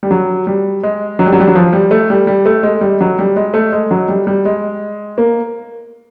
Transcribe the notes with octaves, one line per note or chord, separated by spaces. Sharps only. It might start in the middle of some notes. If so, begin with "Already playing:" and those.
G3
F#3
G3
G#3
F#3
G3
F#3
G3
F#3
F3
G3
A3
G3
G3
A3
G#3
G3
F#3
G3
G#3
A3
G#3
F#3
G3
G3
G#3
A#3